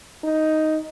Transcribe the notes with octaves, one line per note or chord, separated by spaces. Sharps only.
D#4